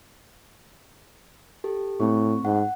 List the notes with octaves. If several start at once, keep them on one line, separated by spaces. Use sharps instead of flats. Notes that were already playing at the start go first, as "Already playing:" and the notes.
G4 A4
A2 A3 C4 C#6
G#2 F#5